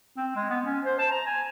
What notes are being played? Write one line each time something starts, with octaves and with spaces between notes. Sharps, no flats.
C4
G#3
B3
C#4
C5
A5
A#5
G#5